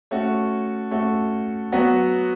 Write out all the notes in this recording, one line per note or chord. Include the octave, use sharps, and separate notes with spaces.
A3 C#4 F#4
A3 C#4 F#4
F#3 B3 F#4